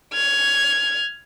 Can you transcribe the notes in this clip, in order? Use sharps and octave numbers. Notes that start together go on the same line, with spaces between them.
F6 G#6